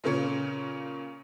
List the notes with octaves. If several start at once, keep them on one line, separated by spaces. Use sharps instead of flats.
A#2 C#3 A#3 C#4